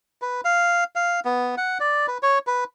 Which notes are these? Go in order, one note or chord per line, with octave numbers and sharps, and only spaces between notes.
B4
F5
F5
B3
F#5
D5
B4
C#5
B4